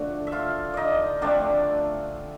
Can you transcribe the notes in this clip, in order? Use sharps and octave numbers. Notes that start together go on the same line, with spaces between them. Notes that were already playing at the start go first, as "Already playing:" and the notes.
Already playing: D3 F3 A3 D4 F#4
E5
F4 F5
D#4 D5 D#5
D3 F3 A3 C4 D4 D5